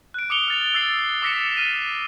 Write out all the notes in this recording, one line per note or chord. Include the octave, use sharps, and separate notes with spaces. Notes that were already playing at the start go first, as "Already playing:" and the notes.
F#6 D7
D6 D#6 C#7 F7 G7
F6 A6 F7
E6 A6 C7
D6 E6 A#6 B6 C#7 E7
F6 B6 D#7